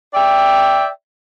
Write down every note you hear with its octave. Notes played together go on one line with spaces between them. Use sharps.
D5 E5 G5